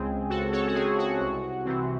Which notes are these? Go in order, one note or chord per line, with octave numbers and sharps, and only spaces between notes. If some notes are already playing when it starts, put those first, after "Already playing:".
Already playing: C#2 C#3 G#3 C4 G#4
C#2 F#4 A4
A4 C#5
F#4
C#3 G#3 C4 G#4
F#4
C2
C3 E3 C4